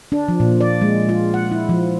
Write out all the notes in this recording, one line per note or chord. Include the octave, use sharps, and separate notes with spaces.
D4
F3
A#2
D5
G#3
F4
F#5
E4
F3